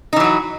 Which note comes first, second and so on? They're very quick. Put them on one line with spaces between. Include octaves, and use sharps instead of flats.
D#4 E3 F#3 F#4